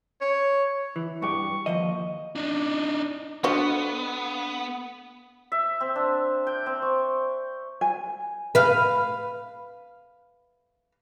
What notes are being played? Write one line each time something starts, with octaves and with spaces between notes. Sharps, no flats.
C#5
E3
G2 G4 C#6
D#2 F3 D#5
D4 D#4
F3 B3 D4 F#4 A4 D#5 F5
E5
C4
D4
G5
C4
C#6
G#5
B4 F5